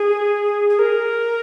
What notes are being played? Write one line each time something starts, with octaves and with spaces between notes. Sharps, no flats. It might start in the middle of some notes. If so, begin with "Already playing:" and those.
Already playing: G#4
G#4
A#4